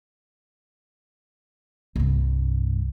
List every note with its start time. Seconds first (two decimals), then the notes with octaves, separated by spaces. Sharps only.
1.96 C2 G2